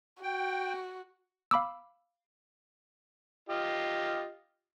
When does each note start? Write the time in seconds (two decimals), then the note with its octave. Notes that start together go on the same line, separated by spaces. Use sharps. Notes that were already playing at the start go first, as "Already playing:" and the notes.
0.23 F#4 G5
1.51 F5 B5 D6 E6
3.49 F4 G4 D#5